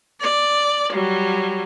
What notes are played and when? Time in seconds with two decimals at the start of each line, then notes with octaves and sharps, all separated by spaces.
0.21 D5
0.93 F#3 G3